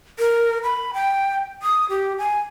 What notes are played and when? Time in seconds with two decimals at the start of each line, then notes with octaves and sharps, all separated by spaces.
0.19 A#4
0.63 B5
0.94 G5
1.62 D#6
1.90 G4
2.18 G#5